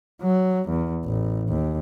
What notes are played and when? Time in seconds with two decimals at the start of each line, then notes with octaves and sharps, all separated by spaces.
0.22 F#3
0.69 E2
1.05 A1
1.50 D#2